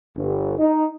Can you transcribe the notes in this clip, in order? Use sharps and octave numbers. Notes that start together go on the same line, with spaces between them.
G1
D#4